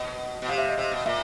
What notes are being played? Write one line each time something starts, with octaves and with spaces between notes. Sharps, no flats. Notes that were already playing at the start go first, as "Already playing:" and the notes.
Already playing: B2 D#5
B2
C3 F5
E5
D#5
C3 E5
B2
A#2 E5